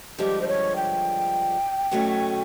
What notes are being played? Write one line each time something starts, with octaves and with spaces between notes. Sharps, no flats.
G2 D3 F3 G#3 G4
C5
C#5
G5
B2 F#3 A3 C#4